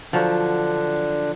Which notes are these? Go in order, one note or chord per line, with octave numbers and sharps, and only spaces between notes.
D3 F3 F#3 D4